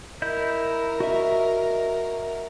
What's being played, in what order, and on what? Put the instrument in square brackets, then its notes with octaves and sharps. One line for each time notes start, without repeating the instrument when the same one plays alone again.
[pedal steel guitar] E4 D#5 G6 [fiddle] A#4
[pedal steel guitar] F#4 D#5 E5